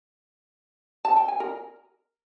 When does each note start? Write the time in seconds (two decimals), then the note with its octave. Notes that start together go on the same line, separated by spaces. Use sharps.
1.05 A5
1.17 G5
1.28 G#5
1.40 A#4